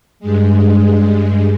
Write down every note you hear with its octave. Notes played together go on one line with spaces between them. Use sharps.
G2 G#3